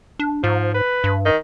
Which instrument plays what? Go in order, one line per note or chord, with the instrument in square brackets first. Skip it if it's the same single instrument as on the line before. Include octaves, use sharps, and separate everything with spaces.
[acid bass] D4
[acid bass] G#2 [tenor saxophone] F3
[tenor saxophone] B4
[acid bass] G2
[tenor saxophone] D#3